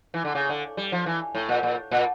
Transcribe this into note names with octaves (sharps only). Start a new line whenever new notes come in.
E3
D3
C#3
D3
G3
F3
E3
A2
A#2
A#2
A#2